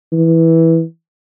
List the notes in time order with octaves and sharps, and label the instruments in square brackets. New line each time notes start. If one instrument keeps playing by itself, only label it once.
[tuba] E3